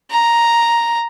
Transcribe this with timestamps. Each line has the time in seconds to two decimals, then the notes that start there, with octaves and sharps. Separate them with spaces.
0.11 A#5